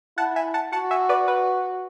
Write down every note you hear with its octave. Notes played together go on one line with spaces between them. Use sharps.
E4 F#5 A5
E5 G#5
F#5 A5
F#4 F#5 A5
E5 G#5
B4 D5
B4